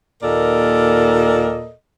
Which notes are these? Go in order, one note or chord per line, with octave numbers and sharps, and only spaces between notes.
D#2 A#2 A4 A#4 D5 D#5